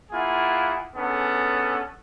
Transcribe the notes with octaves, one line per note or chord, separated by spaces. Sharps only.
A#3 E4 F4 G#4 F#5
B3 C#4 D4 G#4 A4